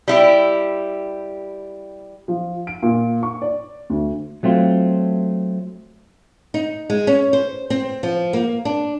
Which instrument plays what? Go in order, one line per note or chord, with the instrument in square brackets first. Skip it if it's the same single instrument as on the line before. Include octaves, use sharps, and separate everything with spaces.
[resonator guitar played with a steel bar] G3 E4 G4
[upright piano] F3
D7
A#2
C#6
D5
D2
[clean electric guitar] F#3 A3 C4 F4
[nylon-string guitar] D#4
G#3
C#4
C5
C4
F3
A#3
D4